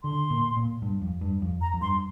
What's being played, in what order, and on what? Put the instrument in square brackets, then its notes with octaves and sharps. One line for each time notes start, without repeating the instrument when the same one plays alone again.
[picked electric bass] D3 [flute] C6
[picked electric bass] A#2
A#2
G2
F2
G2
F2
[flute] A#5
[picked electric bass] F2
[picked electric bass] G2 [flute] C6